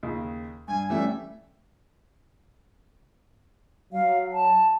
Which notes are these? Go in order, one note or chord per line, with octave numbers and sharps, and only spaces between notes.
D#2 C#3
G2 G#5
E3 G3 A3 C#4 D5 E5
F#3 F5
A5